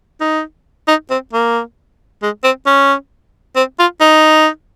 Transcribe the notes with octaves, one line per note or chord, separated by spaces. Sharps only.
D#4
D#4
C4
A#3
G#3
C4
C#4
C4
F4
D#4